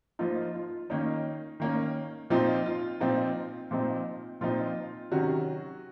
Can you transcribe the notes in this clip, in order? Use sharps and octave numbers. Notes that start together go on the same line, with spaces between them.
F3 A#3 D#4 F4
F4
D#3 A#3 C#4 D#4
D#3 A#3 C#4
A#2 F3 C4 D#4 F4
F4
A#2 F3 C4 D#4
A#2 F3 C4 D#4
A#2 F3 C4 D#4 F4
C3 D#3 F#3 C#4 F#4